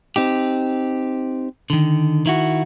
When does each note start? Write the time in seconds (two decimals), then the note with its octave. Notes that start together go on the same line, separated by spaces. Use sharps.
0.16 C4 D#4 G4
1.70 D3 D#3
2.26 D#3 E4 F#4